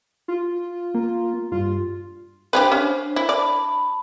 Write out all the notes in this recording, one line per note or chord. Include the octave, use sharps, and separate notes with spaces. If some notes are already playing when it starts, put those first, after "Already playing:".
F4
A#3
G2 F4
D4 G4 G#4 B4 C5
C#4
E4
D5 A5 B5